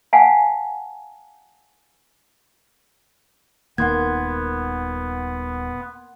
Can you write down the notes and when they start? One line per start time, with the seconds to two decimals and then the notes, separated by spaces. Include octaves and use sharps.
0.13 F5 F#5 G#5 A5
3.78 D#1 D#3 A#3 B3 F#5 C6 G#6